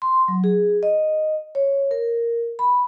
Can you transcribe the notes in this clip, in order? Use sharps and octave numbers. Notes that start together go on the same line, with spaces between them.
C6
F#3
G#4
D#5
C#5
A#4
B5